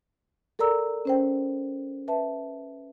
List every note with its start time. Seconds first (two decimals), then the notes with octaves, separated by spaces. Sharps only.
0.59 A4 A#4 D5 A#5 E6
1.05 C#4 C5 G5
2.08 B4 E5 A5